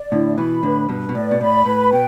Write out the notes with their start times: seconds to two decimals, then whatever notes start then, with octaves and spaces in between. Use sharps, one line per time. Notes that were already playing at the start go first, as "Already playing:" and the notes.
Already playing: D5
0.12 A2 D3 E4
0.37 B2 E3 B5
0.63 A2 D3 B4
0.89 G2 B2 B4
1.09 B2
1.15 A2 D5
1.31 B2
1.41 A2 B5
1.66 A2 B4
1.92 B2 G5